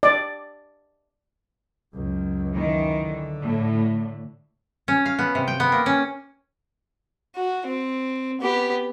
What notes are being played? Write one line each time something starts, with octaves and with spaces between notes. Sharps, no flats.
D5
C#2 F#2
D#3 E3
D3
A2
C#4
F5
B3
C3
G5
B3
A#3
C#4
F#4
C4
B3 G4